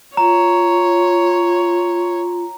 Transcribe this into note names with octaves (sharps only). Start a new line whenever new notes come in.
F4 C#5 A#5